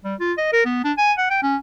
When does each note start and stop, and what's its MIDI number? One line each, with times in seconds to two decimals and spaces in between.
0.04 0.14 55
0.20 0.33 65
0.38 0.49 75
0.53 0.62 70
0.65 0.81 59
0.84 0.93 62
0.98 1.13 80
1.18 1.30 78
1.30 1.41 79
1.42 1.57 61